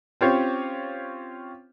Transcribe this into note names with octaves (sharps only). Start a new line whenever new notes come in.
C4 C#4 F4 G4 C5 C#5